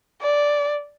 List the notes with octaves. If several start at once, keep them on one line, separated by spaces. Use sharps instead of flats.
D5